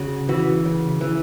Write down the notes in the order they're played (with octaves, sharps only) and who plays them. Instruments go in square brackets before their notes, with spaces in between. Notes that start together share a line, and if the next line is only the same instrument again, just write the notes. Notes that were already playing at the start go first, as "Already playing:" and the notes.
Already playing: [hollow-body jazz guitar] C#3 F#4
E3 F#4
C#3
E3